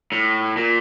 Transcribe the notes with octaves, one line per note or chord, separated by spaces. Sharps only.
A2
A#2